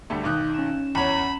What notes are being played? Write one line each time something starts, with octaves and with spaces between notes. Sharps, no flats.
D2 G3 A3
B1 D#3 D6 D#6 F#6 G6
C#4 E7
E2 C#5 B5